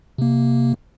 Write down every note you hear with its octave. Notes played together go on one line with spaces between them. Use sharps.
C3 A#3